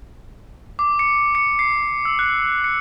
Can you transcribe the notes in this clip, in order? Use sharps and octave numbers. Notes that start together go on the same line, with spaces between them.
D6
C#7
C#7
C7
E6
F#6
C#7